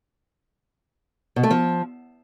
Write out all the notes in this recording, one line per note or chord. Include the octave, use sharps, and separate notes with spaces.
B2
A3
F3